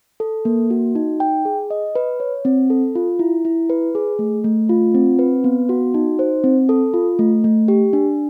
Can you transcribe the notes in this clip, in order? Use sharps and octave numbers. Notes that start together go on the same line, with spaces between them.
A4
A#3
F#4
D#4
G5
G#4
D#5
B4
C#5
C4
A4
F4
E4
E4
B4
G#4
A3
A3
F4
C4
B4
B3
F#4
D#4
C5
C4
A4
F4
A3
A3
G4
D4